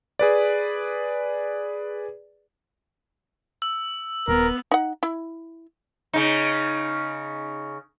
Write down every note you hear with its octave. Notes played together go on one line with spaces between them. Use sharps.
G#4 B4 D5
E6
D#1 B3 A#4
D#4 F#5
E4
C#3 D#4